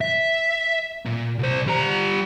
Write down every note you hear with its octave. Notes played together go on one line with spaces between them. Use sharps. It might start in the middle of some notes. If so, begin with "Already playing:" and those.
E5
A#2
C2 C5
G3 A#5